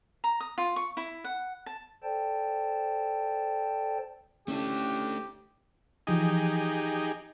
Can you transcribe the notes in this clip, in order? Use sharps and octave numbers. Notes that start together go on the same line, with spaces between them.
A#5
D#6
F4
C#6
E4
F#5
A5
A4 C5 D5 G5 A5
A3 C#4 D4 E4 G4 A4
E3 F3 D#4 G4 G#4 D#6